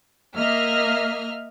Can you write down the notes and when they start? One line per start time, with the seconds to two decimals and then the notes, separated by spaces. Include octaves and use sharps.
0.35 A#3 D#5 E5 F6